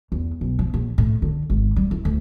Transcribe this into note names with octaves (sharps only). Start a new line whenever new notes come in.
E2
B1
F3
A#1
A2
D3
G#1
G3
E4
D2